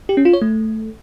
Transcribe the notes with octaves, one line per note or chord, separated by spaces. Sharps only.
G4
C#4
F4
C#5
A3